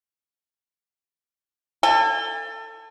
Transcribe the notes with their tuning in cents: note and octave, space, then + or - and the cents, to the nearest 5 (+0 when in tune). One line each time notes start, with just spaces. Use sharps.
A4 +25 G#5 -40